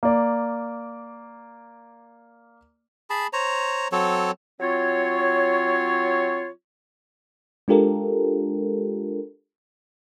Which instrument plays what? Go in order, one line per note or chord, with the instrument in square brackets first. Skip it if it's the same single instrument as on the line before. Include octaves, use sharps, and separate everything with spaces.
[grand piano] A#3 D5
[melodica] G#4 A5 B5
C5 C#5 A#5
F#3 C4 A4 C#5
[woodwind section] F#3 C4 F4 C#5
[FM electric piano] G#3 D4 F4 G4 A4 A#4